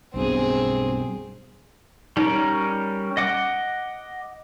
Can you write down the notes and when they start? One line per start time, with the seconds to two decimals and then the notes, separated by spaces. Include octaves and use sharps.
0.14 B1 G2 B2 C4 G#4
2.17 G3 C#4 D#4 A#4
3.17 D#5 F#5 D6